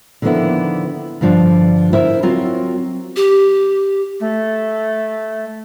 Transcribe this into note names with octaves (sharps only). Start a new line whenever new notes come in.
D3 D#3 F3 A#3 B3 E4
G2 D3 F3 D4
E4 A#4 C5 E5
F#3 C4 F4 F#4 A#4
G4
A3